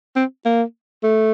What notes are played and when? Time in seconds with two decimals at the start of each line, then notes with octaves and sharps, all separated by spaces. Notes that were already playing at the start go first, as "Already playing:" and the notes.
0.16 C4
0.45 A#3
1.04 A3